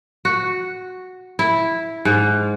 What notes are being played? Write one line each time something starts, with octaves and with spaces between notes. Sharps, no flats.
F#4
E4
G#2